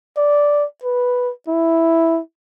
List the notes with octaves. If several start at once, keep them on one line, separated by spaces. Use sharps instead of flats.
D5
B4
E4